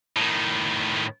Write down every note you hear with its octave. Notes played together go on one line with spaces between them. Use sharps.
A2 D#3